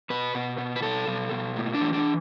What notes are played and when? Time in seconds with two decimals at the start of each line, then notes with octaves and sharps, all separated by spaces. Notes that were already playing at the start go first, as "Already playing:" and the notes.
0.10 B2 B4
0.35 B2
0.58 B2
0.76 B4
0.82 B2 A4
1.07 B2
1.31 B2
1.56 A2
1.74 D4
1.81 E3
1.93 D4